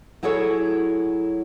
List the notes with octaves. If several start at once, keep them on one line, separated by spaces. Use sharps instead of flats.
F#3 E4 G#4 A4 C#5